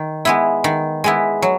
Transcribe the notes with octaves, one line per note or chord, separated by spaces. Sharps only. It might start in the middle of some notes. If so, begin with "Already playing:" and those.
Already playing: D#3
G#3 B3 E4
D#3
G#3 B3 E4
F#3